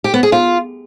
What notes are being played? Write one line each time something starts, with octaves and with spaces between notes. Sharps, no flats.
G4
B3
G#4
F4